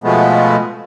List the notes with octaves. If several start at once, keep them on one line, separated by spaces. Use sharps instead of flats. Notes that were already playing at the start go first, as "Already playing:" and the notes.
B2 F3 G#3 A3 B3